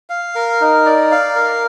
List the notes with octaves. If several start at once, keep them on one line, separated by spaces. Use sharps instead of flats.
F5
A#4
D#4
D5
F5
A#4